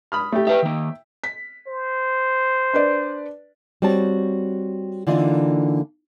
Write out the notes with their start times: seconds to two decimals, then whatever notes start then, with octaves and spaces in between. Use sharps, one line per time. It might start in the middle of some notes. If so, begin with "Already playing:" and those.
0.12 B5 D#6 F6
0.32 A3 G4
0.47 G4 B4 E5 G5
0.62 D#3 A#3
1.24 B6
1.67 C5
2.74 D4 B4 D5
3.82 G3 C4 F#4 C#5 A5
5.07 D3 E3 A#3 D4 D#4 F4